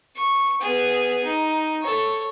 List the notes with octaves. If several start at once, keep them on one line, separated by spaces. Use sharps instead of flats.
C#6
B3 G#4
D#4
A4 C#5